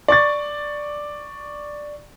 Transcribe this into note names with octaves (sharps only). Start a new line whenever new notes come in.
D5 C#6 A6